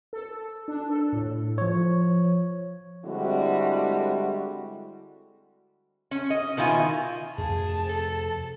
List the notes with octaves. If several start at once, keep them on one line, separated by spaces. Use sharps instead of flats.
A4
D4
A4
A2
F3 C#5
D3 G3 G#3 C4 E4 F#4
C#4
D#5
B2 D#3 E4 F4 G#5
F2 C3 A3 G#4 A5
A4